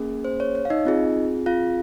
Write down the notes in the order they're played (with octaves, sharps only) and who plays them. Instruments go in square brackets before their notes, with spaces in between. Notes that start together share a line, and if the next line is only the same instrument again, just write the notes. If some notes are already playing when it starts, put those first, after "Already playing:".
Already playing: [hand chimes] A#3 C#4 G#4
C5
C#5
C#5
F5
D#4 D#5
C4 F4 G#4
F4 F5